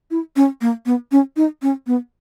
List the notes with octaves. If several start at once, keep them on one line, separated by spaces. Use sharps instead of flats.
E4
C#4
A#3
B3
C#4
D#4
C#4
B3